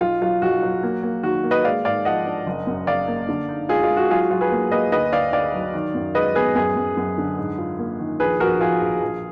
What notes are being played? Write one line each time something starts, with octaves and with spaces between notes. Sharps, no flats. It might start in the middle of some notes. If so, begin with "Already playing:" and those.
B1 F4
F#3 F4
B1 F#4
F#3
A#3
A#3
D#3 F#4
A#3
B4 D#5
G#3 D5 F5
G#2 D5 F5
F3 D#5 F#5
D4
F#1
F#2
F#1 D5 F5
A#3
D3
D#4
G#3 F4 G#4
F4
G#3
F#4
F#3 F4 G#4
F#4
F#3 F4
G#4 B4
A#3
A#3 B4 D#5
D2 B4 D#5
D2 D5 F5
D2 D5 F5
F#3
D#3
F#2
G#3 B4 D#5
B3 G#4 B4
F#2 G#4 B4
F#2
F#2
D3
G#2
F4
A#3
D#3
A#1 G#4 B4
A#1 F#4 A#4
A#1 F4 G#4
A#1
A#1